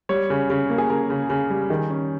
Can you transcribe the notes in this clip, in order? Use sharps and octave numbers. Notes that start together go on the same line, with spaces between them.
G3 C#5
C#3
C#3
A#3
G#4
C#3 A#4
C#3
C#3
G3
D#3 G#4
C#4